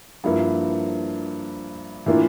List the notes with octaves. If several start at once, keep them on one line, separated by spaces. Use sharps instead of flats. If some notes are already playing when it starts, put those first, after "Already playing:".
G2 F3 A#3 E4
A2 E3 A#3 D4 F4